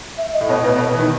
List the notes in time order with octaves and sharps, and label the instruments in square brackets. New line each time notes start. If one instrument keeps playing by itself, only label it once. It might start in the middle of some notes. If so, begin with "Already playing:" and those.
[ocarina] E5
D#5
[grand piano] A2
[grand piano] B2 [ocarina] C#5
[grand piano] A2
[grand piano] B2 [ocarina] B4
[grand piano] B2
B2
E3
D#3